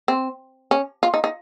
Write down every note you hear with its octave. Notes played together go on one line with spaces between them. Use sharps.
C4
C#4
F4
D#4
D#4